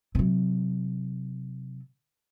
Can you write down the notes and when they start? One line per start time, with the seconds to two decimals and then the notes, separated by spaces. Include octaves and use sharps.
0.15 C3 F#3